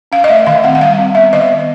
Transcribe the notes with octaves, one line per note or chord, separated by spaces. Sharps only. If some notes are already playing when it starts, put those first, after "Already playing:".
C#4 F5
D#5
A3 E5
D#3 F5
C4 F#5
F#5
G3 F5
C4
B3 E5
D#3 D#5
B3